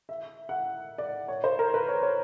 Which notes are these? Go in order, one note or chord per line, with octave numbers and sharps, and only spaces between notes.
E5
F#5
D5
C#5
C5
A#4
B4
C#5
C#5